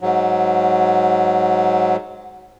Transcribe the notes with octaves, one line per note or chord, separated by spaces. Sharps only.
G#2 F#3